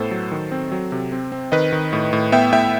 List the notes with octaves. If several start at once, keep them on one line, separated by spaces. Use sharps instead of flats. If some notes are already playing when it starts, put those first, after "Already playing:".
Already playing: A2 B3 A4 C5
F#3
D#3
C4
F#3
C3
C4
C4
D#3 B4 D#5
D#3
A2
A2
B3 E5 G5
A2 E5 G5